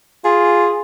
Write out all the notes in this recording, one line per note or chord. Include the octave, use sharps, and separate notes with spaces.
F4 G#4